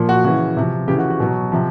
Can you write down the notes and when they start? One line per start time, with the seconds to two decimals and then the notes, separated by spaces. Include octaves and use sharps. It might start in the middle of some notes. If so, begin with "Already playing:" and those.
Already playing: A#2 F3
0.09 F#4
0.24 C#3 E3 F#4
0.57 C3 F3
0.88 C#3 E3 G4
0.99 F#4
1.10 F#4
1.20 B2 F#3
1.52 C3 F3